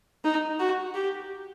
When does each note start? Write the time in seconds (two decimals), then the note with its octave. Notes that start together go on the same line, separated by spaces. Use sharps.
0.24 D#4
0.59 F#4
0.95 G4